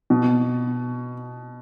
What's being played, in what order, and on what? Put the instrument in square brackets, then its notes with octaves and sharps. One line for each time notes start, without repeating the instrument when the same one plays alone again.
[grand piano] B2